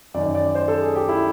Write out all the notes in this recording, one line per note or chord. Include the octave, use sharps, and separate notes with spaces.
F#2 D#3 D5
D5
C5
A4
G#4
G4
E4